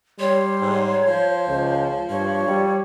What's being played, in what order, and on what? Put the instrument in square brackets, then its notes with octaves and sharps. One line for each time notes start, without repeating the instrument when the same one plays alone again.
[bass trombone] G3 [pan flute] C#5 [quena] C6
[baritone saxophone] G#2
[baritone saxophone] F3 [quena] C5
[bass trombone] C#2
[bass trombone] G2 [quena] C#5
[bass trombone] G3